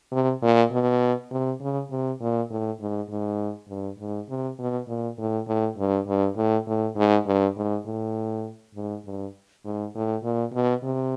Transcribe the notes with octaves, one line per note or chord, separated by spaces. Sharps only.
C3
A#2
B2
C3
C#3
C3
A#2
A2
G#2
G#2
G2
G#2
C3
B2
A#2
A2
A2
G2
G2
A2
A2
G#2
G2
G#2
A2
G#2
G2
G#2
A2
A#2
B2
C3